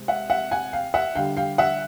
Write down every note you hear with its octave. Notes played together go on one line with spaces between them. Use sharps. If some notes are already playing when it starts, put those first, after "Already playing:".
Already playing: C3 G#3
E5 F#5
E5 F#5
F#5 G#5
F5 G5
E5 F#5
D3 G3 F5 G5
F5 G5
E5 F#5